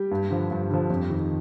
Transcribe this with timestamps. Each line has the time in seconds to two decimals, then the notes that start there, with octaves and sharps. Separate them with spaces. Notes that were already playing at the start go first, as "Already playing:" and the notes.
Already playing: G3 G4
0.11 G2
0.30 D3 F3
0.51 G2
0.71 D3 F3
0.90 F2
1.10 D#3